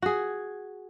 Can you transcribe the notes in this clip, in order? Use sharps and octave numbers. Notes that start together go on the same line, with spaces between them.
F#4 G#4